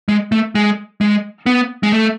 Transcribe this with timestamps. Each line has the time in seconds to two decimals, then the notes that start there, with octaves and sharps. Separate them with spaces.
0.09 G#3
0.32 A3
0.55 G#3
1.01 G#3
1.46 B3
1.83 G#3
1.92 A3